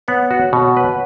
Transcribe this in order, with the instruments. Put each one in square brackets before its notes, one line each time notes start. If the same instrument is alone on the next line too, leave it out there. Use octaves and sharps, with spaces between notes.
[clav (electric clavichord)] B3 [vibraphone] C#5 F#5
[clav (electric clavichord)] F#4
B2
B4